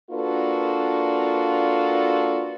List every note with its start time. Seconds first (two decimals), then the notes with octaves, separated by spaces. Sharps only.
0.11 A#3 D4 F4 F#4 A4 B4